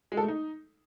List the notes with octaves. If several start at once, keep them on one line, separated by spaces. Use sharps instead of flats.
G#3
A4
A3
D#4